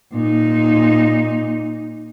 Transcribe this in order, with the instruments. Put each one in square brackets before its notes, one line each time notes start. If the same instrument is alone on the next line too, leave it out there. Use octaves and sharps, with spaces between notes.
[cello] A#2 D#4